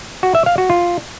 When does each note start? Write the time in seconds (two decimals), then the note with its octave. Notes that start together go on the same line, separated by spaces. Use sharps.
0.23 F#4
0.35 E5
0.46 F5
0.58 F#4
0.70 F4